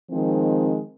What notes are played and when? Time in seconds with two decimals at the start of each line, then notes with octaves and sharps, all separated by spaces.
0.11 D#3 F3 G#3 C4